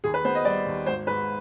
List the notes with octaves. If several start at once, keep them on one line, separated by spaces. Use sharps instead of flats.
D#2 G#4
B4
B3 C5
D#5
G3 D5
D#2
G#1 C5
G#2 B4